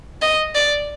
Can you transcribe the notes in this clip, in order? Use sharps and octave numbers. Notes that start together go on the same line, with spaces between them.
D#5
D5